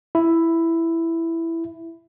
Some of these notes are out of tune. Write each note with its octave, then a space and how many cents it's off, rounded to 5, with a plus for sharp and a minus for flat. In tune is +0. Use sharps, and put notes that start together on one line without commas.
E4 +5